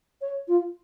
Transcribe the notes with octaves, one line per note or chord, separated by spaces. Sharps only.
C#5
F4